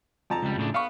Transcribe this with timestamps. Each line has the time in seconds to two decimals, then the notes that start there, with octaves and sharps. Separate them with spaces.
0.30 F2 A5 A#5
0.43 C#2 G3
0.58 A2 C#3 D4
0.74 B3 F5 C#6